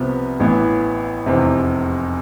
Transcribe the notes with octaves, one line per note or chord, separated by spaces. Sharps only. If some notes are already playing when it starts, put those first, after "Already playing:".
Already playing: C2 C3 F3 B3
A1 A2 E3 B3
F1 E2 C3